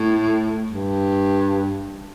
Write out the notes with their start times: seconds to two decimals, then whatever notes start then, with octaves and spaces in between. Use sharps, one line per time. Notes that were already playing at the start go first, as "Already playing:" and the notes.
Already playing: A2
0.70 G2